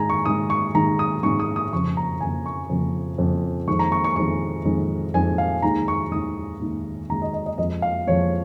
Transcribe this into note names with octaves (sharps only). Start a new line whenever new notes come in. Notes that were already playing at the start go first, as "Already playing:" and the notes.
Already playing: G#2 D#3 G#3 G#5 A#5
C#6
G#2 D#3 G#3 D#6
C#6
G#2 D#3 G#3 A#5
D#6
G#2 D#3 G#3 C#6
D#6
D#6
F2 C#3 F3 C#6
A#5
F2 C#3 F3 G#5
C#6
F2 C#3 F3
F2 C#3 F3
F2 D#3 G#3 C#6
A#5
C#6
C#6
F2 D#3 G#3 C#6
F2 D#3 G#3
F2 D#3 G#3 G#5
F5
D#2 D#3 G#3 A#5
C#6
D#2 D#3 G#3 D#6
D#2 D#3 G#3
D#2 D#3 G#3 A#5
D#5
D#5
D#5
F2 F3 G#3 D#5
F5
F2 F3 G#3 C#5